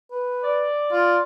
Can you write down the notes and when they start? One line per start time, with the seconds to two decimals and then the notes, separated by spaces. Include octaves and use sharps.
0.11 B4
0.43 D5
0.92 F4